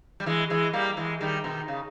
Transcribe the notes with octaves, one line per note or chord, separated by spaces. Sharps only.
G3
E3 G#3
E3 G#3
G3 A#3
E3 G#3
D#3 G3
B2 D#3
C#3